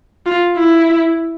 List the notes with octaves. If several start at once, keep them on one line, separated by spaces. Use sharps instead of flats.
F4
E4